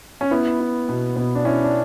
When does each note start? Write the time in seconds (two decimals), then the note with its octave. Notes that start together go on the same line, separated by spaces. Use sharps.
0.21 C#4
0.31 B3 E4
0.60 E4
0.89 B2
1.16 B2 B3
1.35 D4
1.45 C#4 E4
1.64 D4